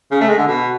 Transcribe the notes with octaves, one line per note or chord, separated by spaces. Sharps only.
C#3
A3
G#3
D3
B2